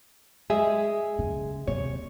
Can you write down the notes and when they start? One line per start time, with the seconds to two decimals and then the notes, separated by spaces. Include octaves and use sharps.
0.50 G#3 G#4 E5
1.19 C#3
1.68 D#2 C3 C#5